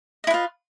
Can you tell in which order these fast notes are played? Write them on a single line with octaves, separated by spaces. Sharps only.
D#5 E4 B4 F4